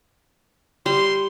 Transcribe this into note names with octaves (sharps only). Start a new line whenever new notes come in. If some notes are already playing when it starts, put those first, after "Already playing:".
G3 C6